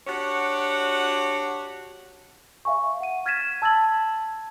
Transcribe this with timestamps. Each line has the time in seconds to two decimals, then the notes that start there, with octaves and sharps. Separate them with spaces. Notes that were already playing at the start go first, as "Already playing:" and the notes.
0.07 D4 F#4 G4 C#5 F#5
2.65 E5 F5 G#5 C#6
3.01 F#5 D#7
3.26 F6 G#6 A6 B6 D#7 E7
3.62 A5 E6 G#6 A6 F#7